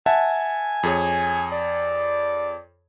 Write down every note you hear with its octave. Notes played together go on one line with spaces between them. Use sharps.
E5 F#5 G#5 A5
F2 G#4 C#5
D5